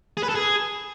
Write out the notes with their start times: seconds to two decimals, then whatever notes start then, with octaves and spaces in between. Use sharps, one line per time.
0.17 G#4
0.23 B4
0.29 A4
0.35 G#4